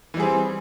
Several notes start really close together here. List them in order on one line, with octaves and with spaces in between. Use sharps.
E3 G3 G#4 C4